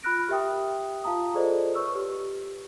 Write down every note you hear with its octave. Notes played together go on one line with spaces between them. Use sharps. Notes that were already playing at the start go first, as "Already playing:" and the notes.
F4 B5 F6 F#6 A#6 D7
G4 A#4 E5 G5 D#6
F4 F5 A5 A#5 D#6
F4 G#4 A4 C5 D5 D#5
B4 C#5 C#6 E6 F6
G4 B4